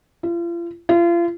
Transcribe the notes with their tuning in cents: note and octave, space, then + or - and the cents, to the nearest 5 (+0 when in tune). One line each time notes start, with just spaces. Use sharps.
F4 -40
F4 -35